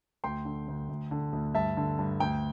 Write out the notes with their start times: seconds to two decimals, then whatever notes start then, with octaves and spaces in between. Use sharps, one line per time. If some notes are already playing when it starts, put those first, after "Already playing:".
0.24 D2 G5 C6
0.45 D3
0.68 D2
0.89 D2
1.11 D3
1.33 D2
1.55 G2 E5 A5
1.77 D3
1.99 G2
2.20 D2 G5